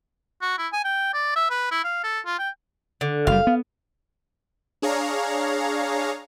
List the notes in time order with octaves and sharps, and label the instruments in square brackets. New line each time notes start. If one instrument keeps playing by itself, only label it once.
[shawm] F#4
E4
G#5
G5
D5
E5
B4
E4
F5
A4
F4
G5
[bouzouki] D3
[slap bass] F#1 G3 [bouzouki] F5
[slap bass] B3
[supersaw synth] D4 G#4 C#5 F5 A#5